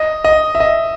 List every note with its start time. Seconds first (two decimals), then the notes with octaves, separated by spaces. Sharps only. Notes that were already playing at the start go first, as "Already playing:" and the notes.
Already playing: D#5
0.24 D#5
0.55 E5
0.60 D#5